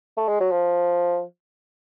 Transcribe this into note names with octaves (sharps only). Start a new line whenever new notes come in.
A3
G#3
F#3
F3